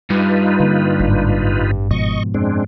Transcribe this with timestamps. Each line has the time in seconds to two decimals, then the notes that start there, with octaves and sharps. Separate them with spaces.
0.10 G2 D#4 F4 B4
0.60 D3 A#3
0.99 G#1 A2
1.91 G#2 B2 F3 D#5 C#6
2.34 F#2 G#3 C4 D4